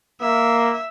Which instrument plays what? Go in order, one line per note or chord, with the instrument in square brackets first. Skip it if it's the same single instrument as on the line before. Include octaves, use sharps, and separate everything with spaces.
[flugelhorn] A#3 [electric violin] E5